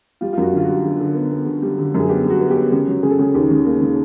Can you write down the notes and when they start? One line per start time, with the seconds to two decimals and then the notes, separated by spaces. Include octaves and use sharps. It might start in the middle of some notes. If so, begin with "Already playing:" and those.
0.21 G3 F4
0.33 F4
0.37 F#2 F#4
0.53 D3 F4
0.63 F#4
0.69 G3
0.85 D3
1.00 D3
1.15 B3
1.32 B3
1.46 D3
1.62 G3
1.79 D3
1.94 F#2
2.00 G#4
2.09 B3 G4
2.26 G3 F#4
2.41 B3
2.51 G4
2.57 B3
2.72 C#3 G4
2.88 F#3
3.03 C#3 G#4
3.11 A4
3.19 C#3 G#4
3.34 D#2 G4
3.51 C#3
3.66 A#3
3.81 C#3